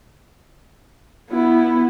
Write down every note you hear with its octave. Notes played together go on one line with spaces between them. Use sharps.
B3 E4